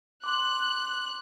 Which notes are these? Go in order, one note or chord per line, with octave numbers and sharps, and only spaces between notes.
C6 D6 F#6